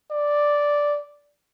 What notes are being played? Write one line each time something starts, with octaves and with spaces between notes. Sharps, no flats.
D5